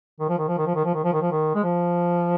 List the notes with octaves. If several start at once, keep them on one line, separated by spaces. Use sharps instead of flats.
D#3
F3
D#3
F3
D#3
F3
D#3
F3
D#3
F3
D#3
F3
D#3
G#3
F3